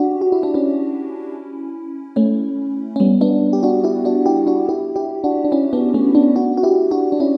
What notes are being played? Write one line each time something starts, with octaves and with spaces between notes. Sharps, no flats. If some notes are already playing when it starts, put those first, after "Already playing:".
Already playing: D4 F#4 G4
F#4
E4
D4
C#4 E4
A3 C#4
C#4
G3 B3
B3 D4
G4
D4 F#4
E4 G4
D4 F#4
E4 G4
D4 F#4
E4 G4
E4 G4
D4 F#4
D4
C#4 E4
B3 D4
A3 C#4
B3 D4
D4 F#4
F#4
E4 G4
D4 F#4
D4
C#4 E4